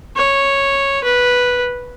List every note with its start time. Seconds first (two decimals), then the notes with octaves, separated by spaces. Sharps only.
0.17 C#5
1.04 B4